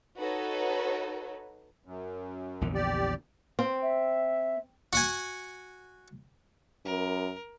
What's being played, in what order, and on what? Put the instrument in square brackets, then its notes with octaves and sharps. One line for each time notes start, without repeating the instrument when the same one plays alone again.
[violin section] D#4 F#4 A4 B4 C#5
[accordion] F#2
[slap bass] A#1 E2 D3
[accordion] G4 D5
[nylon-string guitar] C4
[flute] E5
[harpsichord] F#4 F#5 G#5
[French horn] F#2 [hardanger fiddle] A#4